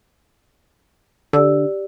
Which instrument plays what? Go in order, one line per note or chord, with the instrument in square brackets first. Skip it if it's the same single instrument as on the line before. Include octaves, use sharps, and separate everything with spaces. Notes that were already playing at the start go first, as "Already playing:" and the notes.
[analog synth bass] D3 [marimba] G4 D5 E6